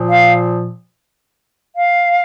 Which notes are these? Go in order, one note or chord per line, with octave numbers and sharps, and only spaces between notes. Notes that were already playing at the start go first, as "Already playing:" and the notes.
Already playing: A#2 F3
F5
F5